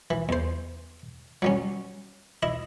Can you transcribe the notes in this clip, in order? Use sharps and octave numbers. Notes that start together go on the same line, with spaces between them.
E3
E2 C5
F#3 G3 C#4
E4 D#5